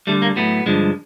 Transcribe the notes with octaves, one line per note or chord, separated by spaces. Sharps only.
D2 D3 G3 A3
A#3
A2 F#3 A3 B3
G2 D3 F3 G#3